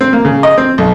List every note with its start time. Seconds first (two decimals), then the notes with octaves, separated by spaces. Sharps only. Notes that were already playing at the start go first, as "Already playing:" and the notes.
0.01 C4
0.13 A#3
0.25 C#3
0.43 D#5
0.58 C4
0.78 B1